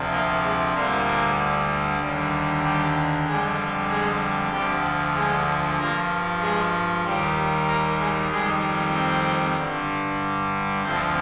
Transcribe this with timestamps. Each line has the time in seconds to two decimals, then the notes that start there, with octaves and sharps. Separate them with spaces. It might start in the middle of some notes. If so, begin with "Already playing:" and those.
Already playing: D2 C3 F3
0.10 A#2 A#3
0.43 G#3
0.74 D2 A#2 D3 G3 A#3
2.00 D#2 D3 G3
2.63 G3 G4
3.26 F2 D3 G3 G#3 G#4
3.89 G#3 G#4
4.52 D2 D3 F3 G3 G4
5.15 G#3 G#4
5.78 G2 F3 A#3 A#4
6.41 G#3 G#4
7.04 D#2 D#3 G3 G4
7.67 A#3 A#4
7.99 G#3 G#4
8.30 F2 D#3 G3 G#3 G#4
8.93 C4 C5
9.56 G2 D3 G3
10.82 D2 D3 F3 C4 C5